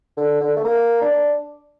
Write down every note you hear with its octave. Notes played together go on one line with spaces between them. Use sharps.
D3
D3
A3
A#3
D4